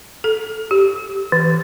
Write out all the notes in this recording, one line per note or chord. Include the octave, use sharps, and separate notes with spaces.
A4
G4
E3